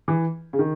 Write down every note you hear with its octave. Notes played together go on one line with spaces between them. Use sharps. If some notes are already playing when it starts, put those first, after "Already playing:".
E3
C#3
D#3